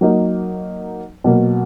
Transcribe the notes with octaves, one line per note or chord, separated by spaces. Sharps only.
F#3 A#3 D#4
B2 F#3 A#3